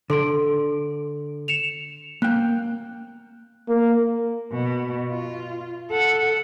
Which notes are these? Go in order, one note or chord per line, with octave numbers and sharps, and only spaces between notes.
D3 A4 C6 D7
C#7 E7 F7
A#3 G5 F#6
A#3
B2
F4
A4 F#5